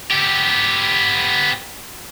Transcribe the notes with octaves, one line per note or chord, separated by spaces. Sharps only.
B3 G4